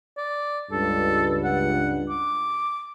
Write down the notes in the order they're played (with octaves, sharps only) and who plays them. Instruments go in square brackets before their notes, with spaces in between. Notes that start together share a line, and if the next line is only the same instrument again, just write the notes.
[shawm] D5
[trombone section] C#2 G2 [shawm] A4
[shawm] F#5
D6